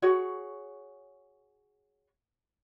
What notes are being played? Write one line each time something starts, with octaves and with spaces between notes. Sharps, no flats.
F#4 G#4 C#5